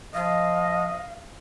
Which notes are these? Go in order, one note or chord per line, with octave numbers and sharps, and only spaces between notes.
F3 D#5 F5